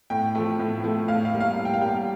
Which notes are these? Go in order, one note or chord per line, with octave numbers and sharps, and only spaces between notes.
A2 G5
F3 A3
A2
F3 A3
A2 F5
F5
G3 A#3
F5
A2
G5
F5
G3 A#3 G5